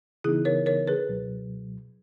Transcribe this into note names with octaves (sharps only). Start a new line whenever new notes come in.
C#3 E3 B3 D#4 E4 G#4
A#4 C#5
A#4 C#5
G#4 B4
C#2 B2 F#3